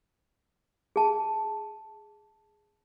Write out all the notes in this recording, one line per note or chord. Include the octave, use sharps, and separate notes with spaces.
G#4 A5